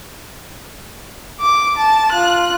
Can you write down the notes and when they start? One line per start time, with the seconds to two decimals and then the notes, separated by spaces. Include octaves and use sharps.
1.41 D6
1.78 A5
2.12 F4 F#6